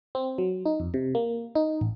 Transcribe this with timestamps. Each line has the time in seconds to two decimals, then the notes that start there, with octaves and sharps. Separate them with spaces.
0.15 C4
0.38 F#3
0.66 D#4
0.80 F2
0.94 C3
1.15 A#3
1.55 D#4
1.81 A1